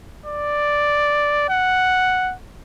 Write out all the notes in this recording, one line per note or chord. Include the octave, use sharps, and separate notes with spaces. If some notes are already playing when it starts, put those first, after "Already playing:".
D5
F#5